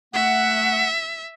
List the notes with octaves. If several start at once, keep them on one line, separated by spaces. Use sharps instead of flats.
A3 E5 F#5